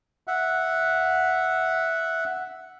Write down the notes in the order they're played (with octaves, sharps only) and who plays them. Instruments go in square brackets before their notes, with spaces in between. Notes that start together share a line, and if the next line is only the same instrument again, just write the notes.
[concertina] E5 F#5